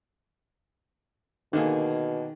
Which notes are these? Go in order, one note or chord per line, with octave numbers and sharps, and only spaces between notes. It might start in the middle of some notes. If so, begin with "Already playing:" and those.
B2 D3 D#3 A#3 G#4